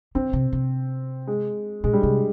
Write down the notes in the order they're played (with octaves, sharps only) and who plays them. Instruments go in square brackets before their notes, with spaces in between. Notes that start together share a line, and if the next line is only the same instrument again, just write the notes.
[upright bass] D#3 [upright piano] C4
[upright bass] C3
C3
[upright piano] G#3
[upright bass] A#2 [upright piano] G#3
[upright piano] G3
[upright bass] C3 [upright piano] G#3